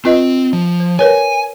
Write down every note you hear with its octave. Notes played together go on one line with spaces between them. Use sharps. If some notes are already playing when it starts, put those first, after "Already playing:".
C4 F4 B4 D#5
F3
C5
A#4 B4 C#5 G#5